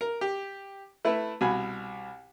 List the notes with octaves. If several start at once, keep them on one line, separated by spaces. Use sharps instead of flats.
A#4
G4
A3 E4 B4
C2 B2 G#5 B5